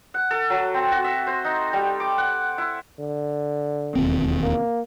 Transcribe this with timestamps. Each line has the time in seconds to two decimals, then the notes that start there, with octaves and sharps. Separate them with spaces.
0.14 F#5
0.31 A4
0.50 F#3
0.74 C4
0.92 F#4
1.04 E5
1.27 C5
1.45 D#4
1.73 G3
2.00 D6
2.18 F#5
2.58 E4
3.00 D3
3.95 E1 D#2 C4
4.43 A#3